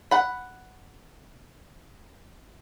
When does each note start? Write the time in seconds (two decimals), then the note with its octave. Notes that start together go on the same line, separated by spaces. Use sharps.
0.11 F#5 B5